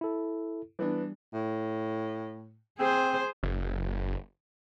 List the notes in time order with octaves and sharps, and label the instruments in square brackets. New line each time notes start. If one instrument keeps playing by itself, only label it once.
[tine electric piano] E4 A4
[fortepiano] E3 B3 D4 [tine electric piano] G3
[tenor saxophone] A2
[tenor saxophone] C4 [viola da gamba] G#4 C5
[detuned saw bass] F#1